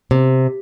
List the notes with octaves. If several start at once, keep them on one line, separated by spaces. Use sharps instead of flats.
C3